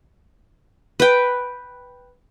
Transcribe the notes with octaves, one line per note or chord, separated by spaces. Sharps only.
B4 G5